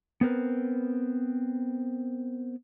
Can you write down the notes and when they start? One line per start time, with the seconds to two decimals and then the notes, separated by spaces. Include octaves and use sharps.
0.21 B3 C4 A#4 B4